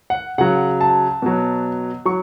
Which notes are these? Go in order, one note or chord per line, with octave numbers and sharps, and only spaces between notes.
F#5
C#3 F#3 F#5
A5
B2 F#3
F#3 C#6